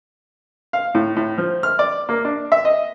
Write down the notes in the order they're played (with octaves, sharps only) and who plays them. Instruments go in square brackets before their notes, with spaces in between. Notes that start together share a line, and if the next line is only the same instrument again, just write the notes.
[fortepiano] F5
A2
A2
F3
F6
D5
A#3
D4
E5
D#5